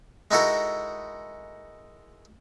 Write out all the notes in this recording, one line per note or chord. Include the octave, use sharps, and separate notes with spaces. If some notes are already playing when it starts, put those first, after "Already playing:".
G#3 D#4 E4 F#4 A4 A#4